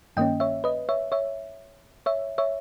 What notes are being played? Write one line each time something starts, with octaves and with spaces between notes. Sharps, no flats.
G2 D#3 A#3 C#4 D#5 G5
C#5 E5
B4 D#5
C#5 E5
C#5 E5
C#5 E5
C#5 E5